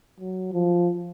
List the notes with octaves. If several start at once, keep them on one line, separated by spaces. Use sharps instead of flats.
F#3
F3